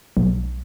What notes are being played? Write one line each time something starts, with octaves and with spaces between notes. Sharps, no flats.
B1